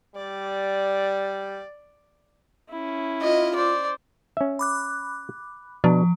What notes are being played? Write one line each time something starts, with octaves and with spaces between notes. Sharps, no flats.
G3 D5
C#4 E4
F4 D#5
C5 D5
C#4 E5
B5 D6 F#6
B2 F3 D4